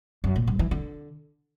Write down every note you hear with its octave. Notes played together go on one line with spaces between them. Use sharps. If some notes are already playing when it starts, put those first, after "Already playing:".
F#2
A#2
G2
E3
D3